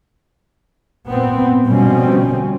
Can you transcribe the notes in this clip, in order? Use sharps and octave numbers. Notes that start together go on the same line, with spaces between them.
A#2 B3 C4
B2 D3 F3 G3 C4 C#4